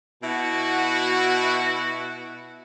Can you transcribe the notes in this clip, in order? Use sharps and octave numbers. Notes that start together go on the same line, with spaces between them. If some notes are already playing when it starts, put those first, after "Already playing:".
B2 E4 F#4